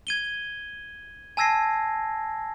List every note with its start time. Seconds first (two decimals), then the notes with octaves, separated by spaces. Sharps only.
0.07 G#6 D#7 G7
1.37 G#5 A5 E6 G#6 A#6 C7